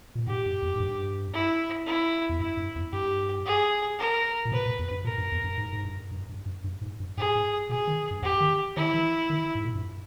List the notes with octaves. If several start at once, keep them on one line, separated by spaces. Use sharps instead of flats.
A#2
G#2 G4
G2
E2
G#2
G2
E4
E4
E2
G2 E4
G2
E2
G2 G4
G#4
A#4
A#2
B2 B4
A#2
E2
G2
A#2 A#4
G2
E2
G2
G#2
G#2
G2
G2
G2
G2
G2
G#2
G2
G#2 G#4
G#2
B2 G#4
D#3
G2
E2 G4
D#3
D#3 E4
E3
D#3
G#2
A#2
G2